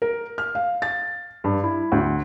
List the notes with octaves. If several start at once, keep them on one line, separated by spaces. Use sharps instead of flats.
A#4
F6
F5
A6
G2
E4
D2